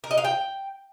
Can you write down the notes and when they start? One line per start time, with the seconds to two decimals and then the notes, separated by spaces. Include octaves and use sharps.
0.04 A#4
0.11 D#5
0.18 F5
0.25 G5